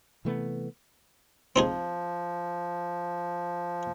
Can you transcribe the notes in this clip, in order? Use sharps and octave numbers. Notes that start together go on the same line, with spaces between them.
C3 E3 A3 B3
F3 C4 D#4 G#4